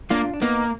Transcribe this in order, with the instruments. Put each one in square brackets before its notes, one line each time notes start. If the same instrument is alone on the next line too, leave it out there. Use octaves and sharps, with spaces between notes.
[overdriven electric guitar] A#3 [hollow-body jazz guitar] D4 F4
[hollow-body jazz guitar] D4
[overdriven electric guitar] A#3 [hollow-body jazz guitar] B3 D#4